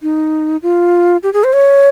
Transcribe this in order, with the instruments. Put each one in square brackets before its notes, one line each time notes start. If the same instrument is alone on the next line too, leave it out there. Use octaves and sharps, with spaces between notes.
[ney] D#4
F4
G4
G#4
C5
C#5